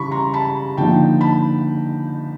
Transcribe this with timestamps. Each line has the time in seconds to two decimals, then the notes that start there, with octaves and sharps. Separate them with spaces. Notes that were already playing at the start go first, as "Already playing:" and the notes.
Already playing: C#3 E3 G3 B5 C#6
0.11 A#5 C6
0.34 A5 B5
0.77 D3 F3 A#3 D#4 G5 A5
1.21 A5 B5